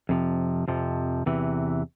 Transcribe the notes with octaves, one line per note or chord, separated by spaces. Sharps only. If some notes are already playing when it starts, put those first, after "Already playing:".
F2 C3 F3
F2 C3 F3
E2 C3 E3